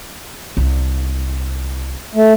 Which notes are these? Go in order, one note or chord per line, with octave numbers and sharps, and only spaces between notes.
C2
A3